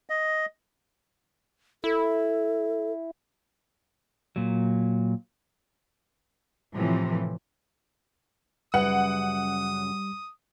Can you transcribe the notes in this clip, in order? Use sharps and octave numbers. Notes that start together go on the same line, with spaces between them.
D#5
E4 A4
A#2 F#3
A2 C3 E3 F3
F#2 C#3 G3 B4 F#5 D#6